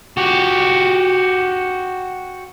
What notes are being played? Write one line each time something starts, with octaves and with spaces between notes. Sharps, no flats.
F#4 G4